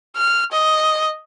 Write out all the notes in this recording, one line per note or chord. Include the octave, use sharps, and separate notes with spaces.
F6
D#5